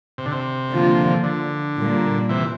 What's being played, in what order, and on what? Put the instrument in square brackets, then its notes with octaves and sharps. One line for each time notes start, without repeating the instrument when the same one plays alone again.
[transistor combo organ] C3
D3
C3
[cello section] D3 F3 A#3 F4
[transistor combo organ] D3
[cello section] A#2 G3 A#3
[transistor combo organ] C3 E3